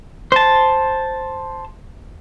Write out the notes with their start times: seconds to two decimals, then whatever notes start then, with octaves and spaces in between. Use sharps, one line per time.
0.32 C5 A5